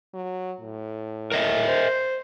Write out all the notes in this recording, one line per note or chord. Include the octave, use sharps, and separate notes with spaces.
F#3
A2
A#4 D#5 E5
C5